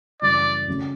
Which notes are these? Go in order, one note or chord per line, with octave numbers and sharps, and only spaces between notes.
F#2 C#3 E3 G3 D5
C#3 F#3 A3 C#4